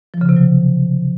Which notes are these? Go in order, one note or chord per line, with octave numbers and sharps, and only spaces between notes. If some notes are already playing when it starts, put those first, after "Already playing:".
F3
C#3
C3
F#3